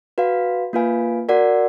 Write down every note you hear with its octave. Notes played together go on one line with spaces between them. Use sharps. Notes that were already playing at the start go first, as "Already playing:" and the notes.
F#4 B4 F5
A#3 F4 B4 F5 G#5
F#4 A#4 D5 F#5